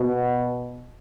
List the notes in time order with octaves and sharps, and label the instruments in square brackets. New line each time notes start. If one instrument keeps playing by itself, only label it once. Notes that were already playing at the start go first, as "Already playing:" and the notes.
Already playing: [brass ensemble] B2